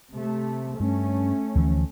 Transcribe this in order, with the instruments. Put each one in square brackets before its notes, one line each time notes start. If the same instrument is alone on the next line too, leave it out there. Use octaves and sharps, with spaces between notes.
[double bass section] C3 A3
[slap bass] G2 [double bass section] A3 C#4
[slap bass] D2 E3 F3